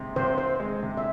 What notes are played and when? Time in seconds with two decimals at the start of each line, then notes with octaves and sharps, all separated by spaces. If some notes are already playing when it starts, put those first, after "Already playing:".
Already playing: C3 G#3
0.16 C3 C5
0.38 C4 C5
0.60 G#3
0.83 C3
0.97 E5